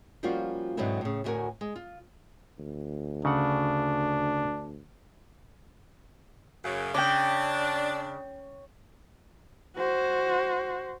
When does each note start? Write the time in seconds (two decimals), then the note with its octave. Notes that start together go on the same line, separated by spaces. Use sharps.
0.23 F3 G3 A#3 C#4 F4 F#4
0.77 G#2 B2 D3 F#3 C4 E4
1.01 A2 C#3
1.24 D2 A2 D#4 F#4 A#4 G#5
1.61 G#3
1.76 F4
2.59 D2
3.25 C#3 D4 F#5
6.64 F#2 C#3
6.94 C#3 D4 G5 D6
9.77 F#4 C5